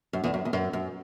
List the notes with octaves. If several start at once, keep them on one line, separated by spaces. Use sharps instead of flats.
F#2
E2
F#2
E2
F#2
F#2